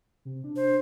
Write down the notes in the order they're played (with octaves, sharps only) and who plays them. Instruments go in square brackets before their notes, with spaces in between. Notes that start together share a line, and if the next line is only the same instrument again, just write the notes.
[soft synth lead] C3
D4
[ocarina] C5